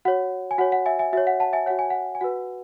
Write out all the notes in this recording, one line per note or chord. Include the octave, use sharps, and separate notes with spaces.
F#4 C#5 F#5
G#5
F#4 C#5 F#5
F#5
E5 G#5
E5 G#5
F#4 C#5 E5
F#5
F#5 A5
E5 G#5
F#4 C#5 F#5
G#5
F#5
G#5
F#4 B4 F#5